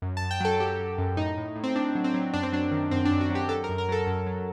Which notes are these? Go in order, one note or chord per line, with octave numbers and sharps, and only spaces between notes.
F#2
A5
F#2
G5
F#3 A4
F#3 G4
F#3
F#2
A2 D#4
A2
A2
C4
A2 D4
F#3
C4
F#3
F#2 D4
C4
F#3 D4
D#3
F#2 C4
D4
F#2
F#4
F#3 G4
F#3 A4
A#4
F#2
A#4
F#3 A4
F#2
F#3